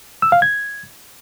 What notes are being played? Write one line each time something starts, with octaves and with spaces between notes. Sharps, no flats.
E6
F5
G#6